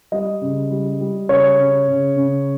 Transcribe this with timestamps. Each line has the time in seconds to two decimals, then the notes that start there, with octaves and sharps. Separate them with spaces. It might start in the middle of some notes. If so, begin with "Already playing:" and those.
0.12 G3 D#5
0.41 C#3
0.71 G3
1.00 G3
1.29 C#3 C#5
1.59 C#3
1.88 C#3
2.16 C#3